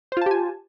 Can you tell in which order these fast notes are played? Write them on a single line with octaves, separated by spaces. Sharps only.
C5 F4 A5 G4 G#5